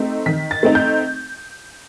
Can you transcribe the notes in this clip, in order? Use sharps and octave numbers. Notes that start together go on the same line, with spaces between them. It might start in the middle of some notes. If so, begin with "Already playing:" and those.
Already playing: A3 C4 D#4
D#3 B6
A6
A3 C4 D#4
G6